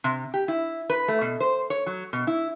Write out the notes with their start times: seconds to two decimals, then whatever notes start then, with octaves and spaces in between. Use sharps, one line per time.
0.04 C3
0.34 G4
0.48 E4
0.90 B4
1.08 A3
1.22 B2
1.40 C5
1.70 C#5
1.86 F#3
2.13 B2
2.27 E4